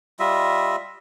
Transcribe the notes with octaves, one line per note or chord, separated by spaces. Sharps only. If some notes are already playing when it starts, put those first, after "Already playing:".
G3 F4 D#5 E5